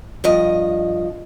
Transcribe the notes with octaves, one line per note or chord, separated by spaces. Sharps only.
G2 F3 D#5